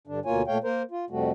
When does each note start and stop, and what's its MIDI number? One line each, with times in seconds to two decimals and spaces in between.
0.07 0.20 43
0.07 0.20 50
0.07 0.20 62
0.25 0.42 38
0.25 0.42 47
0.25 0.42 58
0.25 0.42 65
0.25 0.42 73
0.25 0.42 80
0.47 0.58 46
0.47 0.58 57
0.47 0.58 73
0.47 0.58 77
0.47 0.58 79
0.64 0.82 58
0.64 0.82 70
0.64 0.82 72
0.91 1.05 65
1.10 1.31 41
1.10 1.31 48
1.10 1.31 55
1.10 1.31 57
1.10 1.31 66